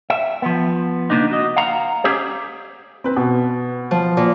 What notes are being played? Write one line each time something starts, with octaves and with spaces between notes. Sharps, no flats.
E5
F3 B3
C#3 A#3 B3 D4 D#4
F#4 D#5
F5 F#5 A#5
C#4 G4 G#4 C5
C4 B4
B2
F3
A#2